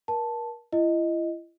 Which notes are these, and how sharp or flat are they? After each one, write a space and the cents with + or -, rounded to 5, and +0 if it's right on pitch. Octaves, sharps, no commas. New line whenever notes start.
A#4 +30 A5 +0
E4 +40 D#5 +0